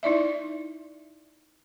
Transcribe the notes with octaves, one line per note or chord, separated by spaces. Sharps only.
D#4 E4 D5 E5